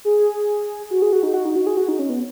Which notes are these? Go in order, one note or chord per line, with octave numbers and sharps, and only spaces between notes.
G#4
F#4
G#4
F#4
D#4
F#4
D#4
F#4
G#4
F#4
D#4
C#4
B3